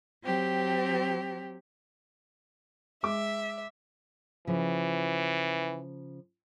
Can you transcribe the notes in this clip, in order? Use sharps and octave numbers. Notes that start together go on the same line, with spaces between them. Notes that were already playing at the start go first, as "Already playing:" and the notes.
F#3 C4 G4
G#3 E5 D6
C#3 E3 F3